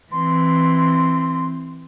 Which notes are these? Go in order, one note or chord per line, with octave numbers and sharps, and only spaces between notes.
E3 C4 C6